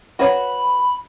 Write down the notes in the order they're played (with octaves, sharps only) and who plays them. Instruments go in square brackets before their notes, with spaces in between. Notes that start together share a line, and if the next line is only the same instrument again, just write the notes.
[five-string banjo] F#4 B4 C#5 [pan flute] B5